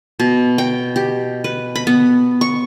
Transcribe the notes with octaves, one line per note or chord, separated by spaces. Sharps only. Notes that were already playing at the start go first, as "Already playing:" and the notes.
B2
G5
G4
B4
B5
B3
C#6